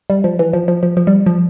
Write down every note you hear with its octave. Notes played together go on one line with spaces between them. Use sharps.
G3
F3
E3
F3
F3
F3
F3
G3
F3